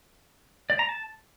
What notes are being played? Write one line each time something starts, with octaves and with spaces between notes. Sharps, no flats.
D5
A#5
A5